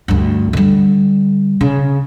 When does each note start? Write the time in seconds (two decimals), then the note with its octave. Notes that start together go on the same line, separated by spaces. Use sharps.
0.08 D2 G2
0.53 D3 G3
1.61 C#3